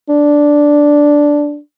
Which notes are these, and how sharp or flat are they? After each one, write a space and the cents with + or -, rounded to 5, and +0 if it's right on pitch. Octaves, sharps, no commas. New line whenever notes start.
D4 -5